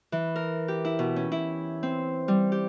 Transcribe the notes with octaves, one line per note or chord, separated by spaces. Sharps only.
E3
A#4
G4
E4
B2
C#4
E4
C4
G3
G4